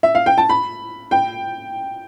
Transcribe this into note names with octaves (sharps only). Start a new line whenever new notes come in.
E5
F5
G5
A5
B5
G5